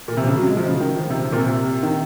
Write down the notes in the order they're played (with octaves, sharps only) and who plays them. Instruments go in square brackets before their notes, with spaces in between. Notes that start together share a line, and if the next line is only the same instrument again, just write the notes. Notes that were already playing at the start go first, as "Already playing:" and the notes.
[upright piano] A#2
C3
C#3
F#3
G#3
F3
C#3
D#3
F3
C3
C3
A#2
C3
D#3